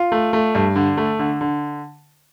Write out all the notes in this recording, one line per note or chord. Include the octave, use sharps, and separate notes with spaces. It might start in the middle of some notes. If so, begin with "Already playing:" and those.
Already playing: F4
A3
A3
G2
D3
A3
D3
D3